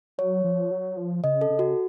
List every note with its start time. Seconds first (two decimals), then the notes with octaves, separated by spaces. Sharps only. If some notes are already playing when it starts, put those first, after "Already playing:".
0.18 F#3 C#5
0.44 F3
0.71 F#3
0.97 F3
1.24 C#3 D#5
1.41 A4
1.50 C#3
1.59 F#4